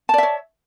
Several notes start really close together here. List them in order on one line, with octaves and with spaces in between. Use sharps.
A5 D5 E5 C#5